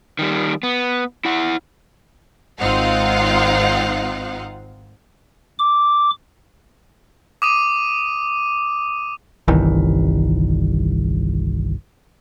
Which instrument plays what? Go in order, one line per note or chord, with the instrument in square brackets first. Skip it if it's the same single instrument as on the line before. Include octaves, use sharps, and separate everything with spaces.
[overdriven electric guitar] D#3 G3
B3
E4 F#5
[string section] G#1 C4 D#4 F4 F5 F#5
[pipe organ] D6
[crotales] D6 D#6 D#7
[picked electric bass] G1 C2 D#3 E3